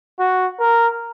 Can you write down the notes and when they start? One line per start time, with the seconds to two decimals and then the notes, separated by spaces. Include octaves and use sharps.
0.20 F#4
0.60 A#4